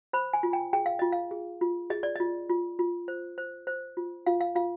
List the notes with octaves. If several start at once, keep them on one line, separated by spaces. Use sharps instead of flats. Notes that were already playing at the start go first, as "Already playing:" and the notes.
C5 B5
G#5
F4
G5
G#4 G5
F5
F4 D#5
F5
G#4
F4
G#4 D#5
D5
F4 D#5
F4
F4
C5
C5
C5
F4
F4 F5
F5
F4 F5